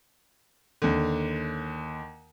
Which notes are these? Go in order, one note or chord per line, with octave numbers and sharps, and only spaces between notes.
D#2 D3